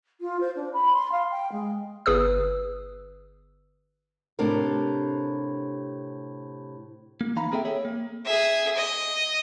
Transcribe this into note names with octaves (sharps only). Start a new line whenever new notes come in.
F4
C5
D4
B5
C6
F5
G5
G#3
G1 G#4 B4 D#6 E6
A2 C3 D4 G4 A#4
A#3
E3 D#4 F5 A#5 B5
A#3 C4 G#4 A4 E5 G5
G#4 A4 C#5 E5
A#3
G#4 E5
D#5